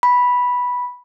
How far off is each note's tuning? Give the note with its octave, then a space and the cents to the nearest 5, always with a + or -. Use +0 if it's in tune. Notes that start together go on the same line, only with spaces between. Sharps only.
B5 -5